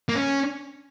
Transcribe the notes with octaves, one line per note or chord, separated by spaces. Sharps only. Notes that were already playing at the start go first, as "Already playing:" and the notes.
A#3
C#4